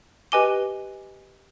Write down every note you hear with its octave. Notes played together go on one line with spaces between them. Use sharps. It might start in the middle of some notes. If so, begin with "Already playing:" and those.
G4 B4 D#5 G#5 D6 G7